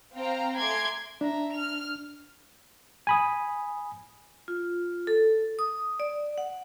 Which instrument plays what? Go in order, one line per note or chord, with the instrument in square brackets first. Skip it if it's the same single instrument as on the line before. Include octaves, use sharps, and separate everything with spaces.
[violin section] C4 F5 G5 A#5
A3 G#5 A#5 C6 D6 G#6
[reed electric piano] D4 [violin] E5 A#5
[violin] F6 F7
[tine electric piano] G#5 B5 D#6
[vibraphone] F4
A4
D#6
D5
F#5